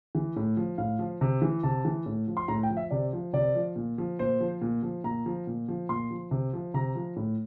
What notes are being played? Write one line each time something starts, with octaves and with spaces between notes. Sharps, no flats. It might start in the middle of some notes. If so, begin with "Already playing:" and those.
E3
A2
F3
A2 F5
F3
C3
E3
C3 A5
E3
A2
F3
C6
A2 A#5
G5
F3
E5
C3 D5
F3
C3 D5
F3
A#2
F3
A#2 C5
F3
A#2
F3
A#2 A#5
F3
A#2
F3
A#2 C6
F3
C3
F3
C3 A#5
F3
A2